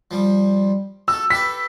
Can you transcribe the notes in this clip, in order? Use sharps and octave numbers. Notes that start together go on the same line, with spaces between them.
F3 G3
F#4 A4 E6
G4 A4 B4 B6